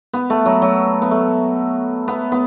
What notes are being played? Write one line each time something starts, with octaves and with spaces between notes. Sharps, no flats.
B3
A3
F#3
F#3
B3
A3
B3
B3